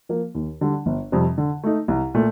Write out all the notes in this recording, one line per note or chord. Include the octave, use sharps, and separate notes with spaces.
F3 A#3
D#2
D3 G3 D4
G1
F2 C3 G3 C4
D3
A3 D#4
C2
A#2 A3